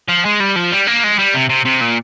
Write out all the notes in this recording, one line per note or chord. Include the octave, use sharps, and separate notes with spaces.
F3
G#3
G3
F3
G3
A#3
G#3
G3
C3
C3
C3
A#2